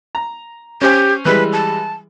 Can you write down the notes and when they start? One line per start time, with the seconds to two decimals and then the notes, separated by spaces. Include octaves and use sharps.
0.15 A#5
0.82 C#4 G4 C5 G#5
1.25 E3 G3 G#3 B4
1.53 A5